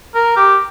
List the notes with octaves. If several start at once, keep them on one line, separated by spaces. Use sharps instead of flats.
A#4
G4